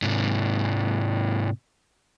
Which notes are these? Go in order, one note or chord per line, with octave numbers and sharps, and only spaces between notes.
G#2 C3